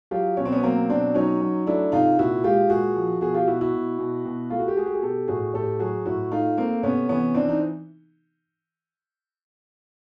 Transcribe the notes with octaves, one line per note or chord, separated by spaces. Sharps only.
F#3 F4 G4
B2 C#4
C4
B3 C#4
F#3 A#3 C4
B2 C4 D4
F#3 C#4 D#4
F#3
A3 D4 E4
C3 D#4 F4
A#2 E4 F#4
G#3 F4 G4
A#2 F#4 G#4
F3
B2 F#4 G#4
F4 G4
B2 E4 F#4
E4 F#4
B2
B2
B2
A3 F4
F#4
G4
A3 F#4 G#4
G4
G#4
B2 G4 A4
A2 F#4 G#4
A2 G4 A4
F#3 F#4 G#4
A2 E4 F#4
A3 D#4 F4
A3 A#3 C4
C3 B3 C#4
E3 B3 C#4
E3 C4 D4
D#4